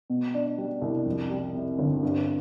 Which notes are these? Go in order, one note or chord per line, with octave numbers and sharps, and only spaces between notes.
B2
D4
G3
C2
F2
G3
C3
G1
G2